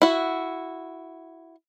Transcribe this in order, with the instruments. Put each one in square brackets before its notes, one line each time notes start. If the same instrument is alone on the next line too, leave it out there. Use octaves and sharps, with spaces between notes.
[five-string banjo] E4 F#4